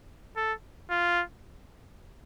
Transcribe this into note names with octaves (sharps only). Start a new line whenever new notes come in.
A4
F4